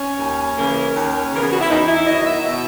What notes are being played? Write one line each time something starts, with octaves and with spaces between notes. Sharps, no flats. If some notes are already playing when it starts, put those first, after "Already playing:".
Already playing: C#4
D#2
C#3 E3 A#3
D#2
C#3 E3 B3 A#4
G#4
F#4
E4
E2 D#4
E4
D#3 F#3 B3 D#5
E5
B2 E5